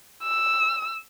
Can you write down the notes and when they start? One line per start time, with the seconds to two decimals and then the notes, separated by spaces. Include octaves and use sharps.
0.23 E6